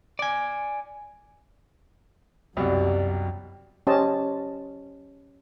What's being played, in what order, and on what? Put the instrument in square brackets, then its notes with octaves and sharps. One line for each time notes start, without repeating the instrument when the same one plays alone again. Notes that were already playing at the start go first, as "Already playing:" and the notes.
[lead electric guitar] D5 G#5
[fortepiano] C2 B2 F#3 [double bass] F#2 [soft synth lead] G4 [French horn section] D5
[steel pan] C#4 G4 C5 D#5 A5